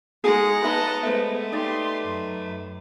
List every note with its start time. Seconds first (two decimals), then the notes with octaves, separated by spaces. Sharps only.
0.24 G#3 D#4 F#4 G#4 F#5 A#5
0.63 D#4 B4 D#5 E5 A5 B5
1.03 G#3 A3 B3 B4 C5 E5
1.52 D#4 G4 D5 C6
2.03 F#2